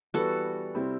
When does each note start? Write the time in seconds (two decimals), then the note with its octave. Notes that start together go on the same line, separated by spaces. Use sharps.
0.14 E3 G3 B3 F#4 A4
0.75 C3 G3 C4 E4